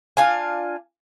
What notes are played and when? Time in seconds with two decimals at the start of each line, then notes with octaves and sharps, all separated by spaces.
0.17 D4 F4 G#5